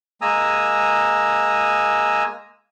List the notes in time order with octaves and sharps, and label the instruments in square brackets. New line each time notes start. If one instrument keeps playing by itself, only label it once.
[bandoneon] G#3 A#3 G#5 A#5 D#6 E6